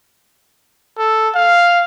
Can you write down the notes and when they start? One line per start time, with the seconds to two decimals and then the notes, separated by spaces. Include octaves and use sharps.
0.98 A4
1.35 F5